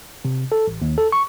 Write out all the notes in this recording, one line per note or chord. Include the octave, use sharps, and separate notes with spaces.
C3
A4
A1
D#2
A4
C#6